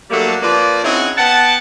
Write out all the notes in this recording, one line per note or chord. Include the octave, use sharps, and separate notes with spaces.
F#3 G3 A3 A#3 D4 A4
F3 A#3 F4 B4 D5
C4 C#4 D#4 E4 F#4 G#4
B3 F#5 G5 A5